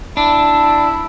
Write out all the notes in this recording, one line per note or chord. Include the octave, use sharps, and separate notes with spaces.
D4 E4